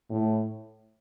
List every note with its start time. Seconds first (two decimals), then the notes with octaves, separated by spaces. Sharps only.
0.10 A2